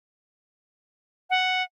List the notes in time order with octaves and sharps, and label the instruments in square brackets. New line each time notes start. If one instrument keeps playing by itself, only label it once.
[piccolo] F#5